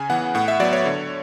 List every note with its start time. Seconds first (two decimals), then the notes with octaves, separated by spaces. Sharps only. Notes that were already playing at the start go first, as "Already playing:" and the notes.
Already playing: C#3 G#5
0.10 E3 B3 F#5
0.35 A2 F#5
0.48 E5
0.60 F#3 B3 D5
0.73 C#5
0.86 D3